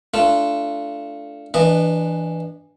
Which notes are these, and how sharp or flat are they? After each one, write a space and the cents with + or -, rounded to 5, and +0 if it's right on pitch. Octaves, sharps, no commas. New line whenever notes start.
A3 +0 D4 -5 F4 -25
E3 +0 D4 +0 D#5 -30